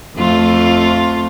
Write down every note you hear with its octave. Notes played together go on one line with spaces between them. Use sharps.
F2 A3 F4